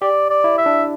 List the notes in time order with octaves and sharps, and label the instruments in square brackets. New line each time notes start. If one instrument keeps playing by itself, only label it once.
[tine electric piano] G4 [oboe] D5
[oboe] D5
[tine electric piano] E4
[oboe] E5
[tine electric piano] D4